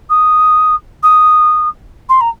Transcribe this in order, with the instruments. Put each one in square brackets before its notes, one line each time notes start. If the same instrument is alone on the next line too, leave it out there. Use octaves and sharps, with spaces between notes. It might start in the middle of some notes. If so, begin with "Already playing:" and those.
[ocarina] D#6
D#6
C6
A#5